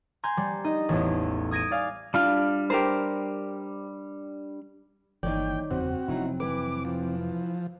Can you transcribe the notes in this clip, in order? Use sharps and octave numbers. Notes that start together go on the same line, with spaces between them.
G#5 A#5 C6 G6
G3
D#4 D#5
A1 E2
D#6 G#6 A#6 D7 D#7
D5 F5 G#5
G3 D4 F4 F6
G4 A#4 C5
G1 D#3 E3 G3 A#3 C#5 D5 G5
F#1 E2 G3 C4 F#4
F1 F#3 C#4 D#4 E4
E3 B4 D6
F3